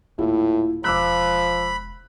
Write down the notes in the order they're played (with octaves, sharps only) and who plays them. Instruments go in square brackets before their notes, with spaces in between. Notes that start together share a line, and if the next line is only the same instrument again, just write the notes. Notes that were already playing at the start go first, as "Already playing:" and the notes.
[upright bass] D#1 A#3 [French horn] A2 [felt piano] E4 F4
[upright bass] E1 G#3 [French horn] F3 [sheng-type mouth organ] B5 [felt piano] D6 E6 F#6